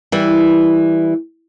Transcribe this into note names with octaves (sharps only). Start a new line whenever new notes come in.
E3 G3